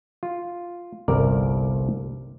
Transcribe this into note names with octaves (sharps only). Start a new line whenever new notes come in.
F4
G1 C2 A#4 D5